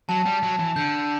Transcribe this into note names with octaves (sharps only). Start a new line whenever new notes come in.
F#3 A5
G3
F#3
E3
D3 G6